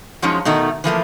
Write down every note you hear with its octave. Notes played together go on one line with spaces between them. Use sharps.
F3 F#3 G#3 C#4 D#4 F4
B2 D#3 A3 D#4
E3 F3 A3 A#3